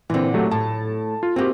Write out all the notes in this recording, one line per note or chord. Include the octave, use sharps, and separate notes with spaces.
A#2 D3 E3 C4
F#3 A3 G4
A2 A5
F4
E3 A#3 C4 F#4 G4